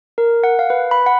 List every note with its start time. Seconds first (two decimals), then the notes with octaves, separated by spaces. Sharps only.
0.18 A#4
0.44 F#5
0.59 F5
0.70 B4
0.91 B5
1.06 F#5